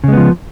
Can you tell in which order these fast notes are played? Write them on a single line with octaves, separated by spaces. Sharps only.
C#3 G#3 B3 F3